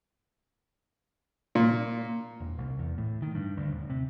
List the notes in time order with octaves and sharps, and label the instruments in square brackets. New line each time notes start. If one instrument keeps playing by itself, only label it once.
[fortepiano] A#2
[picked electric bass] E1
C2
E2
A2
D#3
G2
D2
D#1
C3